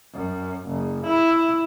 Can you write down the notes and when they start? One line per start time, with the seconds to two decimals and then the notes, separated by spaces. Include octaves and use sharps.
0.15 F#2
0.69 F#1
1.07 E4